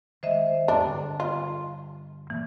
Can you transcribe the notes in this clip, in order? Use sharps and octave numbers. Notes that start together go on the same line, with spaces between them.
D#3 G#3 C5 D#5 E5
E2 G#2 D4
G2 D3
F4
A#2 E3 A#3